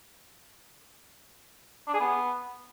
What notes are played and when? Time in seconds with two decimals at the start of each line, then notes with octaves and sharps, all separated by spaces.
1.87 D4
1.94 G#4
2.00 B3